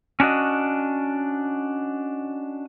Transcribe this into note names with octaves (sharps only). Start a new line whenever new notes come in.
C#4 D4 F#4 D#5